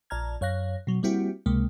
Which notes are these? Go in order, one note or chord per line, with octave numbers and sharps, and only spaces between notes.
A#1 D5 A5 A#5 F6 G#6
F#2 C#5 F5 F#6 A#6
B2 F#3
G3 A#3 C4 E4 F#4 G4
C#2 C3 G#3 A#3